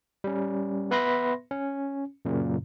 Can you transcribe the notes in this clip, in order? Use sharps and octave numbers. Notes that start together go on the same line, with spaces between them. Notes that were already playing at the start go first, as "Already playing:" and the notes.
G3 C#4
B3 B4 E5 B5 C6 A#6
C#4
F#2 A#2 C#3